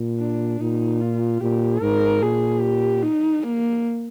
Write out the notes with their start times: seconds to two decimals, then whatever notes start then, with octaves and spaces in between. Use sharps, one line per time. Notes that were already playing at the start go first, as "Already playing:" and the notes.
Already playing: A#2
0.19 D4
0.60 A#2 D#4
1.01 F4
1.41 A#2 G4
1.81 G#2 A#4
2.22 A#2 G#4
2.62 G4
3.02 D#4
3.43 A#3